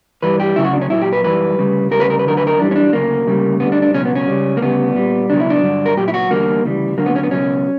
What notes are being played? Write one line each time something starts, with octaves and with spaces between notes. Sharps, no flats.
G2 E3 G3 B4
G4
D2 C#3 F#3 E4
F#4
D4
C#4
A#2 F#3 E4
G4
B4
F#2 E3 G3 B4
D2 C#3 G3
D2 C#3 G3 A#4
B4
A#4
B4
D2 D3 F#3 A#4
B4
A#4
F#2 E3 G3 D4
C#4
D4
D2 C#3 F#3 A#3
D2 C#3 G3
D2 D3 G3 B3
D4
D4
C#2 B2 F#3 C#4
B3
C#4
C#2 C#3 G3
A#3
D2 C#3 G3 B3
A#2 G3
C#2 B2 F#3 D4
E4
D4
G2 D3 F#3
A#4
A#2 F#3 G4
E4
F#4
E2 D3 G3 A#3
D2 C#3 E3 G3
D2 D3 F#3 A#3
B3
C#4
B3
C#2 B2 F#3 C#4